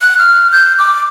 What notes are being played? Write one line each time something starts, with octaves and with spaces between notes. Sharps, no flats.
F#6
F6
G6
D6